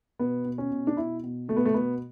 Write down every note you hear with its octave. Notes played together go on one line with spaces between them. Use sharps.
B2 B3
B2
C#4
B2
D4
B2 E4
B2
B2 A3
B3
A3
B2 B3